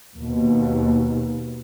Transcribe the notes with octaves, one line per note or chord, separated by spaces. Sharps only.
D#2 B2